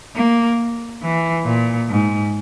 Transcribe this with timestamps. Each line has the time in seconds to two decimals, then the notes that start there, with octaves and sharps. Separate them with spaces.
0.16 A#3
1.02 E3
1.45 A#2
1.89 G#2